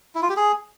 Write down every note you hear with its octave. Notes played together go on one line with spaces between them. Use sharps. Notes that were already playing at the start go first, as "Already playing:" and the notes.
E4
F4
G4
G#4